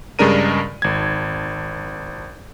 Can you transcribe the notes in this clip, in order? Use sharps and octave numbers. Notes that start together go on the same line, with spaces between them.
G2 C#3 G#3 D4 A#4 D#7
G#1 G#6